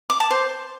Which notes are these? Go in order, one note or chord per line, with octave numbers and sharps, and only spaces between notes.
D6
A5
C5